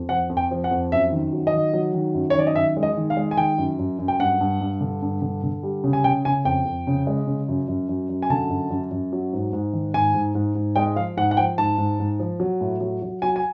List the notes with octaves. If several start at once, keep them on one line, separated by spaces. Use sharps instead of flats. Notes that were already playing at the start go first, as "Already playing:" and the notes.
Already playing: F2
F3 F#5
F2
G5
F3
F#5
F2
F#2 E5
D#3
F#3
D#5
D#3
F#3
D#3
F#2
C#5
D#3 D5
D#5
F#2 E5
G#3
D#5
D#3
F5
G#3
G#5
D#3 G5
F#2
F#2
F#2
G5
G2 F#5
G2
G2
D3
G2
D3
D3
G3
C#3
G#5
C#3 G5
C#3 G#5
F2 G5
F2
C#3
G#3
C#3
F#2
F#2
F#2
F#2
G#5
D3 A5
F#2
F#2
F#2
F#3
G#2
G#2
D#3
G#2 G#5
G#2
G#2
G#2
G#3 G5
F3 F5
G#2 F#5
F#5
F3 G5
G#2 A5
G#2
G#2
F3
F#3
A2
F#3
F#3
F#3 G#5
G#5